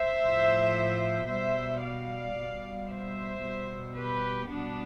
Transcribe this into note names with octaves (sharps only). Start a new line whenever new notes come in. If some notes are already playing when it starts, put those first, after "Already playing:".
Already playing: C5 E5
A2 F3
B2 G3 C5 E5
D5 F5
B2 G3
C5 E5
B2 G3
G4 B4
B2 G3 B3 D4